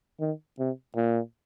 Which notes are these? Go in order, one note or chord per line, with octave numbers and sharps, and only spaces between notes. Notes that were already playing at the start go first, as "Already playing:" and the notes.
D#3
C3
A#2